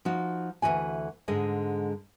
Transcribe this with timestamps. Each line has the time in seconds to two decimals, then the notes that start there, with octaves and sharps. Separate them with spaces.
0.05 F3 D#4 F#4
0.62 D2 B2 E3 F#4 G#5
1.28 G#2 D3 G#3 G#4 D#5